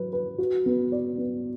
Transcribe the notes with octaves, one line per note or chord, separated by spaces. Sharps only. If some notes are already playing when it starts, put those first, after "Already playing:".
Already playing: F#3 B4
B4
F#4
B3
D5
B3